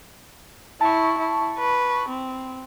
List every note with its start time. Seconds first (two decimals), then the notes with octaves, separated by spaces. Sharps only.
0.81 E4 A5 C#6
1.18 E4
1.59 B4
2.09 C4